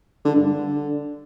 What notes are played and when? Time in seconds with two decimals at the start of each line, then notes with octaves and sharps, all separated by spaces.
0.25 D3
0.36 G2
0.46 D3